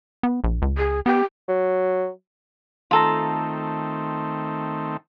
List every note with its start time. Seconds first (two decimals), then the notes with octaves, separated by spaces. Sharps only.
0.23 B3
0.44 A#1
0.62 C#2
0.78 G#4
1.06 B3 G4
1.48 F#3
2.91 D#3 A3 C4 F4 A4 A#5